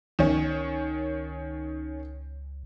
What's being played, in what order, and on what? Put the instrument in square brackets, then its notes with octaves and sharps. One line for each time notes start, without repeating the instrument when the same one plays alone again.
[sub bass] C#2 [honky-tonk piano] D#3 C#4